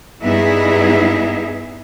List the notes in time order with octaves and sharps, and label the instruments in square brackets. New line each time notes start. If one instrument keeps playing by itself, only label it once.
[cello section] G2 B3 D#4 E4 G#4 E5